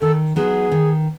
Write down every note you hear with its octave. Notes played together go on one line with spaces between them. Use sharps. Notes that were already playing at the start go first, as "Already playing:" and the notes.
D#3 A4
F#3 B3 D#4 G#4
D#3